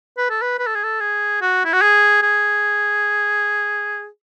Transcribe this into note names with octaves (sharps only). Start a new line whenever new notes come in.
B4
A4
B4
B4
A4
G#4
A4
G#4
F#4
E4
F#4
G#4
G#4